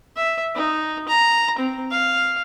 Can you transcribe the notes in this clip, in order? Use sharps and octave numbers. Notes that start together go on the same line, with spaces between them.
E5
D#4
A#5
C4
F5